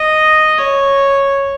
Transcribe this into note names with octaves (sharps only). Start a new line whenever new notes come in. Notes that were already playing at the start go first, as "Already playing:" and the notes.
Already playing: D#5
C#5